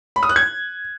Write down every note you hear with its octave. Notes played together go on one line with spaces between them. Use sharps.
B5
D#6
F#6
G#6